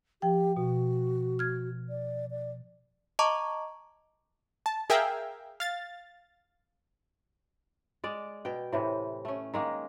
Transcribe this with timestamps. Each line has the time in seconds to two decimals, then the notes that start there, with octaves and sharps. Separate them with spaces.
0.22 F3 G4 G5
0.57 B2 F#4
1.39 F6 G#6
1.90 D5
2.31 D5
3.19 D#5 A5 A#5 C#6 D6
4.66 A5
4.90 G#4 A#4 E5 F5 G5
5.60 F5 A6
8.04 G#3 D5
8.45 B2 G5
8.73 A2 C3 E3
9.25 A3 C#4
9.54 D#3 G#3 A#3